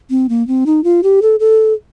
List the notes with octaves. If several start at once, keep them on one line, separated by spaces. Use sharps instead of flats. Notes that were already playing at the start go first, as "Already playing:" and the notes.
C4
A#3
C4
D#4
F4
G4
A4
A4